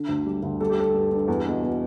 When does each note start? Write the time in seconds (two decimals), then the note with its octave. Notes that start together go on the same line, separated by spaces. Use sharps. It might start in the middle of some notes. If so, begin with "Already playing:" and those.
Already playing: D3
0.09 D2
0.26 G3
0.43 D2
0.60 G3 A4
0.70 G4
0.77 G3 A4
0.94 G2
1.11 G2
1.28 E2
1.46 B2
1.62 B2